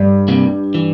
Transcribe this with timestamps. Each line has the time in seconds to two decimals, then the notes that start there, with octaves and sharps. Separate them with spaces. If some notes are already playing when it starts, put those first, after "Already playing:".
Already playing: G2
0.28 C3 G3 A#3 E4
0.74 E3